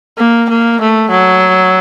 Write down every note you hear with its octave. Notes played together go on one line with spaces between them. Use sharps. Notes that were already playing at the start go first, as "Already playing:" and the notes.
A#3
A#3
A3
F#3